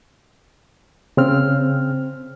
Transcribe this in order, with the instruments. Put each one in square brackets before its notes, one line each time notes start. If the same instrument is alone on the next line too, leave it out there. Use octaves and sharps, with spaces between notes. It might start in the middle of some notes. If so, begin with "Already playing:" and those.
[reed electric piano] C#3 C4 F6